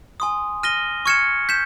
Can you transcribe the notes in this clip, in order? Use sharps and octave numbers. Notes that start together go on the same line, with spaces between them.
G#5 C6 D#6
F6 A#6 D#7 G7
C#6 F6 G#6 C#7 E7
G6 B6 E7